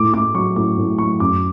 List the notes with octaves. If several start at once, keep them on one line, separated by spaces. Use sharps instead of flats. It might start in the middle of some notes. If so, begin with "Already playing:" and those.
Already playing: A2 D6
A2 D6
F#3 C#6
A2 D6
A2
F#3 C#6
F#2 D6